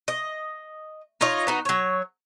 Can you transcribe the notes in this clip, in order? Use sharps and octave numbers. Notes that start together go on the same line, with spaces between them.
D#5
D#4 F4 C#5 D#5
B3 D#4 F#4
F#3 C#5